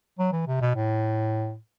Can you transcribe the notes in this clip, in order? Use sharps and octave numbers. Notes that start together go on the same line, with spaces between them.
F#3
E3
C3
B2
A2